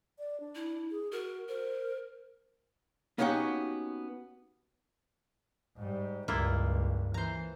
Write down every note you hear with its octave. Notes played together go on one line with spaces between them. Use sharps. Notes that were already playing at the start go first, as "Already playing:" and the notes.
D5
D4
E4
G#4
F#4 A#4
A#4 C5
A#3 B3 C#4 D#4 F#4 G4
G#2 G3
C#2 G2 A#3 E4 F4
E3 C5 A#5